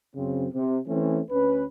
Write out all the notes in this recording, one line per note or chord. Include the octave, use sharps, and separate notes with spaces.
F#2 C#3 C4
C3
E3 A3 C4 C#4
D2 C#4 B4